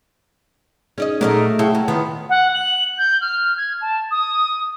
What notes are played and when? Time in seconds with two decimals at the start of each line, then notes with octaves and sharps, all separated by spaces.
0.98 C#4 D#4 G#4 D5 D#5
1.21 A#2 F#3 A3 A#4 D5 D#5
1.59 C#3 E4 F#5 G5 A5
1.75 F#3
1.88 D#3 B3 F4
2.30 F#5
2.54 F#7
2.98 G6
3.21 F6
3.57 G#6
3.81 A5
4.11 D#6